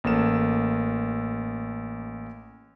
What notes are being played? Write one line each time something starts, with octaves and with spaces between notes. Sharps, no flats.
A1 A#3 A4 E7